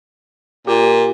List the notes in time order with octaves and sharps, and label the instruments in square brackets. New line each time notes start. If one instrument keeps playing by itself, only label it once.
[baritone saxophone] A#2 [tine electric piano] G4